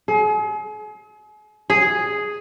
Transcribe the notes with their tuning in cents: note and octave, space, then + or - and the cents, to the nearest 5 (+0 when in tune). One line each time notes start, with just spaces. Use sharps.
G#4 +40
G#4 +0